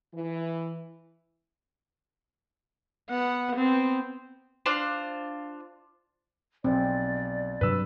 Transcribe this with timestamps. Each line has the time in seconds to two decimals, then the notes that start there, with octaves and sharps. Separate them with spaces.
0.14 E3
3.10 B3 F#5
3.56 B3 C4
4.66 D4 F4 C5
6.64 B1 C4 D5
7.61 G2 C3 F#3 B4 E6